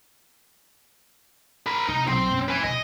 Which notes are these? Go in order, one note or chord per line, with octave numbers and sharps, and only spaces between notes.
A#4 B5
C3 D#4
B1 C4
F#1
B4 G#5
D#1 B2 D#5